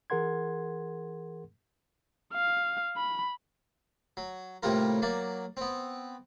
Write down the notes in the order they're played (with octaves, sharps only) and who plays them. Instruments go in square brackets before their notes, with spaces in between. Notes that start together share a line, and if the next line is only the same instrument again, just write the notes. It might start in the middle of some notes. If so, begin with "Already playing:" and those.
[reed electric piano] E3 G#4 A#4 F#5 C6 G#6
[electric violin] F5
B5
[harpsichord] F#3
A2 C3 G3 A#3 F4 A#4
F#3 A#3 D5
B3 C4